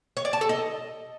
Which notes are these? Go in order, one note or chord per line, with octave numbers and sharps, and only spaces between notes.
C#5
D5
A5
A4
D#5